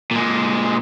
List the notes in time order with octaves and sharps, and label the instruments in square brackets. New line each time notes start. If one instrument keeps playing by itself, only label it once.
[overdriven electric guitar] A#2 G#3